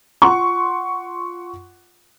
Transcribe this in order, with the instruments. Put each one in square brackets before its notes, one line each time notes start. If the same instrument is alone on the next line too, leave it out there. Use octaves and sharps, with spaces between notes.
[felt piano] F4 F#5 C6 C#6